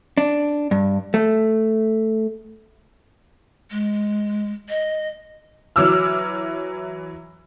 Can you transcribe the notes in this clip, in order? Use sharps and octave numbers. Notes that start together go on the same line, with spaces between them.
D4
G2
A3
G#3
D#5
E3 F#3 D6 E6 F6